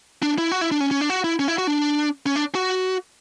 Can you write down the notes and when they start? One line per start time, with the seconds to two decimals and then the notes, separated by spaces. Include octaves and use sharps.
0.23 D4
0.38 E4
0.52 F#4
0.61 E4
0.71 D4
0.80 C#4
0.91 C#4
1.01 D4
1.10 F#4
1.24 E4
1.39 C#4
1.48 E4
1.58 F#4
1.67 D4
2.26 C#4
2.36 D4
2.55 F#4